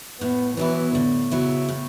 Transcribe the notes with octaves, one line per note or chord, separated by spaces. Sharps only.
A2 B3
E3 F#3 B3 E4
A2 D3
C#3 F#3 B3 E4
A2